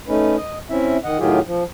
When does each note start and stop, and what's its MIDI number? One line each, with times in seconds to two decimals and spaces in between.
0.08 0.36 57
0.08 0.36 61
0.08 0.36 63
0.08 0.36 71
0.37 0.58 75
0.70 0.97 60
0.70 0.97 61
0.70 0.97 64
0.70 0.97 76
1.04 1.18 51
1.04 1.18 75
1.04 1.18 78
1.19 1.39 45
1.19 1.39 51
1.19 1.39 54
1.19 1.39 65
1.19 1.39 67
1.19 1.39 68
1.46 1.63 53